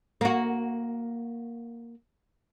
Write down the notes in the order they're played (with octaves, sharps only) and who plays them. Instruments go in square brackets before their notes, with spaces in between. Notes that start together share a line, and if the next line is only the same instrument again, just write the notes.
[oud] A#3 F#4